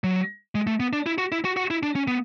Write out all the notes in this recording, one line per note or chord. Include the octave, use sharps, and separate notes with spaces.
F#3
G#3
A3
B3
D4
E4
F#4
E4
F#4
F#4
E4
D4
C#4
B3